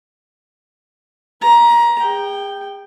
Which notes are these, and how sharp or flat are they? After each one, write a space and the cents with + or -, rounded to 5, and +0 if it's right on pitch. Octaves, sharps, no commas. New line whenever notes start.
B4 -10 A#5 +20
G#4 -40 G5 +0